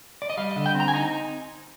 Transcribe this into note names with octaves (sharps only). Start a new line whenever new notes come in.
D5
D#5
G3 F5
D#5
D3
G5
C4
A#5
G#5
D#4 A#5